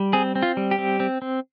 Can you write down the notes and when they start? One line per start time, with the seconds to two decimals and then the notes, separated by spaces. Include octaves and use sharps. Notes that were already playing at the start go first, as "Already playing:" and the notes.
Already playing: G3
0.13 C4 G#4
0.36 C4
0.43 F4
0.57 G3
0.71 G4
0.79 C4
1.00 C4
1.22 C4